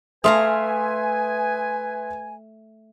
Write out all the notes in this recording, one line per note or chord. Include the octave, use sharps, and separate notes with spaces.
A3 B4 E5 F5 G#5 A#5 C6 D#6